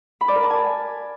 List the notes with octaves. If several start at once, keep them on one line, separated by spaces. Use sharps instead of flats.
B5
D5
A#4
A5
G#5